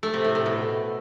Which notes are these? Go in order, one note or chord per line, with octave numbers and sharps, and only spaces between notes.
A3
C3
A2
A2
B2